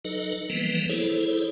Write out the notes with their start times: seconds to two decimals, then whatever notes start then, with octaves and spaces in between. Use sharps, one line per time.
0.05 F#3 D#4 A4 B4 D#5
0.50 E3 F3 G3 A#3 B3 B4
0.89 E4 G#4 A4 C5 C#5